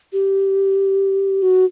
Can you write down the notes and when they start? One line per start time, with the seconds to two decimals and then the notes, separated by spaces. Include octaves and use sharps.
0.13 G4
1.42 F#4